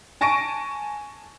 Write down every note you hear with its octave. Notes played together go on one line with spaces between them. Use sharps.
G#5 A5 C#6 A#6 D7 D#7